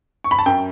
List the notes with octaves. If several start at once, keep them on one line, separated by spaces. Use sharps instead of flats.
C#6
B5
A5
F#2 G5